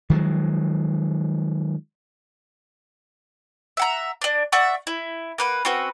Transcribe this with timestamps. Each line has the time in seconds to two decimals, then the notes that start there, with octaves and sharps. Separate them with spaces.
0.10 D#3 F3 F#3 G#3
3.77 E5 F#5 A#5
4.22 D4 D5
4.52 D5 E5 F#5 C#6
4.87 E4
5.38 A#3 B4 F#5
5.65 C4 C#4 F#4 B4